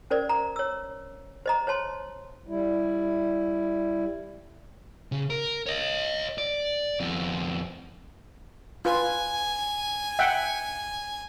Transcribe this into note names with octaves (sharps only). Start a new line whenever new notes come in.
C#4 A#4 C5 D5
A#5
C#5 E6
C5 D#5 A#5
C5 C#5 A5 C6
G3 E4
C#3
A#4
C#5 D#5
D5
F2 B3
F4 B4 G#5
E5 F#5 G5